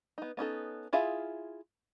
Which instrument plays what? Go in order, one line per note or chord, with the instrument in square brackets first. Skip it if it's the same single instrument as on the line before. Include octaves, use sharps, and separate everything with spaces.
[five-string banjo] B3 D#4
B3 C#4 D#4 A4
E4 F4 G#4 E5 F5